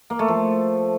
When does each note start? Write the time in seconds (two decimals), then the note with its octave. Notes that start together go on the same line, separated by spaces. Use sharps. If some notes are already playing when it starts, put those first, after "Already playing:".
0.10 A#3
0.19 A3
0.28 F3